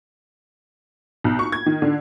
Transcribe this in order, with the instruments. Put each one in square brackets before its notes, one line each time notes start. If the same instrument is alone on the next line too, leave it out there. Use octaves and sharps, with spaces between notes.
[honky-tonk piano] B1
C#6
G#6
D#3
D3